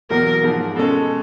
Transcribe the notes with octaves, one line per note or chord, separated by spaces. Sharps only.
E2 B2 F#3 A#3 A#4
G#2 F3 A#3
B2 G#3 C#4 A4